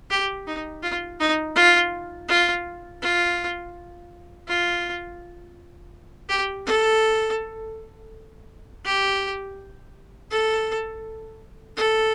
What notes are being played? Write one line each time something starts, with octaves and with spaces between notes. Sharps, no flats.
G4
D#4
F4
D#4
F4
F4
F4
F4
G4
A4
G4
A4
A4